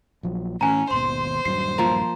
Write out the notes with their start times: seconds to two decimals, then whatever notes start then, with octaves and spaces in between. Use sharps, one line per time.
0.23 A#1 F3 F#3
0.61 A2 E3 C#4 G#5 A#5
0.91 G#1 D#2 B2 C5 C6
1.45 D#1 G2 F#3 C7
1.78 F3 A#3